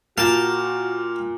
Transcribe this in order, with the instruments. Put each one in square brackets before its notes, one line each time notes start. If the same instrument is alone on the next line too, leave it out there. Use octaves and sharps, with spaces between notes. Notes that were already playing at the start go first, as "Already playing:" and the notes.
[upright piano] A#2 [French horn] F#4 [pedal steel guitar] F5 G5 A#5 [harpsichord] A5